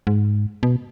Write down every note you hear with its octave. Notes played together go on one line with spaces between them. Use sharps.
G#2
B2